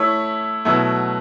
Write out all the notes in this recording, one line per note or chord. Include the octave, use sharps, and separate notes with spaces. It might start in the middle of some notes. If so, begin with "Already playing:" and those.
Already playing: A3 E4 C#5 E5
B2 F#3 A3 E4